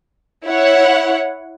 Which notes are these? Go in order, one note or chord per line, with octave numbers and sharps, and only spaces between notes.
E4 C#5 F#5